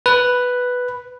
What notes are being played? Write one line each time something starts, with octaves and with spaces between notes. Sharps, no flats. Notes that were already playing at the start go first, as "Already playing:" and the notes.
B4